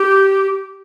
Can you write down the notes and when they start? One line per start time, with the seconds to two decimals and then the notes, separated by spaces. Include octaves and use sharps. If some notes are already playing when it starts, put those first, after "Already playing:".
Already playing: G4